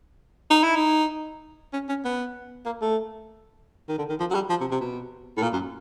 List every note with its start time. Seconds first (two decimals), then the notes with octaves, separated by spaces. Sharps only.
0.50 D#4
0.63 E4
0.76 D#4
1.73 C#4
1.89 C#4
2.05 B3
2.65 A#3
2.81 A3
3.89 D#3
3.98 D3
4.09 D#3
4.20 F3
4.30 F#3
4.34 G3
4.49 F3
4.60 C3
4.71 C3
4.80 B2
5.37 A2
5.42 A#2
5.53 F#2